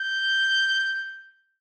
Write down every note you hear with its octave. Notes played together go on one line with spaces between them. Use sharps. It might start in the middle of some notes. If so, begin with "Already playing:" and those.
Already playing: G6